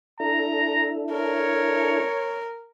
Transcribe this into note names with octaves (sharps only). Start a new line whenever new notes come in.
D4 E4 A4 A#5
A#4 C#5